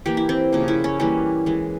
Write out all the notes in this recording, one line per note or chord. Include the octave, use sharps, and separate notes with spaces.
E3 A#3 G4
E4
C4
C#3 F3 A#3
E4
C#4
E3 G3 A#3 C#4
E3 G#3